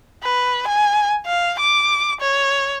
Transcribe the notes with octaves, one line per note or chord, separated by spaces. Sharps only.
B4
G#5
F5
D6
C#5